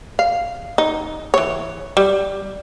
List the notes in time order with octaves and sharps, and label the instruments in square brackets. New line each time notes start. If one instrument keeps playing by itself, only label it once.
[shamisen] F5
D#4
E3 C#5
G3